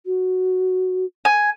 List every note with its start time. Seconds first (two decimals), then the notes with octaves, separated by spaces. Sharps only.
0.05 F#4
1.25 G#5